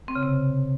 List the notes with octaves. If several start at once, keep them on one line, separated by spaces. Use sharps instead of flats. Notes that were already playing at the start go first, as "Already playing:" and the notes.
C4
C#3
C3